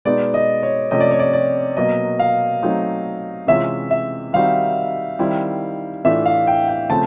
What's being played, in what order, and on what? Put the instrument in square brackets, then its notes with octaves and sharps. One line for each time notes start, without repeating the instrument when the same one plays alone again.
[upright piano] B2 G#3 B3 D#4 [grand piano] D5
[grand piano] D#5
C#5
[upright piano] C3 F3 A3 C#4 [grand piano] D#5
[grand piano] D5
C#5
D5
D5
[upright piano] B2 F#3 A#3 [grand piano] D#5
[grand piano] F5
[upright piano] F#3 A3 C4 D#4
[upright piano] C3 E3 G#3 C#4 F4 [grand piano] E5
[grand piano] E5
[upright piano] D#3 G3 C4 D#4 F#4 [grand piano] F5
[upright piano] D#3 G3 C4 E4
[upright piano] A2 E3 A3 D4 F4 [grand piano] E5
[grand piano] F5
G5
G5
[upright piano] C#3 F3 A3 C4 [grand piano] A5